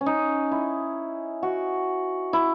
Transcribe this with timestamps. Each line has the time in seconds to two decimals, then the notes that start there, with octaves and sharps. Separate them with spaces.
0.01 C#4
0.06 D#4
0.51 E4
1.43 F#4
2.33 E4